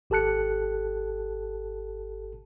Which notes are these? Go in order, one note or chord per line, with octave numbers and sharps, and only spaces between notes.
G#1 G4 A4 A5 F#6 C#7